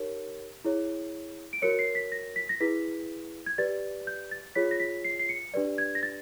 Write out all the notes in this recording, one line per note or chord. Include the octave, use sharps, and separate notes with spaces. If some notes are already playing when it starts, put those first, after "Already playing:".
Already playing: D#4 G4 A#4 C#5
E4 G#4 C#5
D7
F#4 A#4 C#5 C#7
C7
B6
A#6
B6
A#6
E4 G#4 B4 B6
G#6
G4 B4 D5 A6
G6
A6
F4 G#4 C#5 B6
A#6
B6
C7
C7
C#7
D4 G4 B4 D5
G#6
A#6
A6